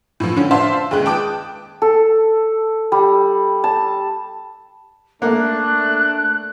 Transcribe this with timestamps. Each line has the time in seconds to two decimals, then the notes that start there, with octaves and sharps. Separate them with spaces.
0.20 A2 F3
0.36 D3 C#4
0.51 C5 D5 E5 F5 A5 C6
0.91 D#2 C#3 G#3 F#6
1.06 G5 A5 D6 D#6
1.82 A4
2.92 G3
3.64 A5
5.22 A3 A#3 D4 F#6